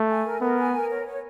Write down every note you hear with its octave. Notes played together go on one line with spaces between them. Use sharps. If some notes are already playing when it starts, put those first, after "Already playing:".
Already playing: A3
G#5
A#4
B3 A#4
G#5
A#4
C#5
C#5